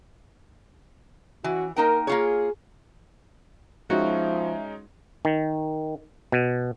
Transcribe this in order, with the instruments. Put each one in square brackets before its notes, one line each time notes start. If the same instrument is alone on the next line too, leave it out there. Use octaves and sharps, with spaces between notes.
[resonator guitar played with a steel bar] E3 [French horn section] C#4 E4 F#4
[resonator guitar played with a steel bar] A#3 D#4 G5 [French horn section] A#4
[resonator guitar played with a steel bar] A#3 F4 C#5 [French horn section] G#4
[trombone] F3 [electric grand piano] G#3 C#4 D#4 [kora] F#4 [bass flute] E5
[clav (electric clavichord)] D#3
B2